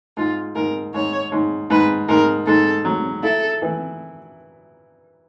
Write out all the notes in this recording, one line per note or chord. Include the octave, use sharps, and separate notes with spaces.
G#2 F4
G#2 A#4
G#2 C#5
G#2
G#2 B4
G#2 A#4
G#2 A4
F#3
E4 A4
E3